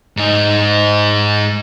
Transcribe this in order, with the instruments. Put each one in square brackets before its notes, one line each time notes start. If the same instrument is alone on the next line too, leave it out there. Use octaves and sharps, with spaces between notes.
[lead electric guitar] G#2 D#4